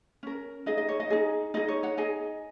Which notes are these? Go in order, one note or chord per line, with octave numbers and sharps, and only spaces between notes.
C#4 A#4
D#4 G#4 D#5
D#5
C#5
D#5
D#4 G#4
D#4 G#4 D#5
C#5
C#5 F#5
D#4 G#4 D#5 G#5